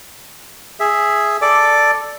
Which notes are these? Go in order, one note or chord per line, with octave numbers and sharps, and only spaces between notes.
G#4 E5
A4 D5 D6